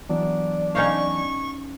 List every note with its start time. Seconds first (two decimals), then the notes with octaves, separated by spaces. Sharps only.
0.09 E3 F#3 B3 D4
0.75 C#4 D#4 F5 C#6